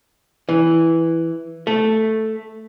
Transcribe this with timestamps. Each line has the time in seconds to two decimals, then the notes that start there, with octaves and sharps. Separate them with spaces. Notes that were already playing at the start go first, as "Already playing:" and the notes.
0.49 E3
1.67 A3